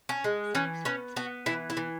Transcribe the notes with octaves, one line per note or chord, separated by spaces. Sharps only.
C#4
G#3
E3 C#4
B3 C#4
B3 F#4
E3 E4
E4
E3